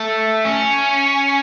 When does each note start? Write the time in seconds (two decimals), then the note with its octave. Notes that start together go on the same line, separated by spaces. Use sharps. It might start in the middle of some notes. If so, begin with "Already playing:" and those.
Already playing: A3
0.45 C#4